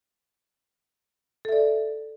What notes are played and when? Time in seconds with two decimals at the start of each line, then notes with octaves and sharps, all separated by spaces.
1.45 A4
1.49 E5
1.52 D5